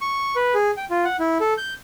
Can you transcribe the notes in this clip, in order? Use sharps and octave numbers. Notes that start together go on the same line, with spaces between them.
C#6
B4
G#4
G5
F4
F#5
E4
A4
G6